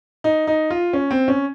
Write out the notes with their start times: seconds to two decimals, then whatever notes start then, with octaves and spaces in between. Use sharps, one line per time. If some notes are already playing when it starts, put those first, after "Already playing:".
0.24 D#4
0.47 D#4
0.70 F4
0.93 C#4
1.11 C4
1.28 C#4